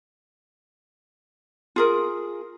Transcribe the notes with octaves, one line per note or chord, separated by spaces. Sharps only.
F4 G#4 A#4